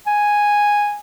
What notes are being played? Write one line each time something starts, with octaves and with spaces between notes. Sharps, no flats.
G#5